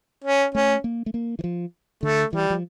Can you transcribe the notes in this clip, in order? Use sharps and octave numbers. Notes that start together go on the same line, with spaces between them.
C#4
A3 C#4
A#3
A3
A#3
E3
F3
D3 A3
E3 G3
F3